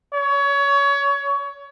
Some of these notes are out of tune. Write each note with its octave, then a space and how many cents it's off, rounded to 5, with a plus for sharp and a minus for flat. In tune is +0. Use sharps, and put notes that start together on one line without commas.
C#5 +25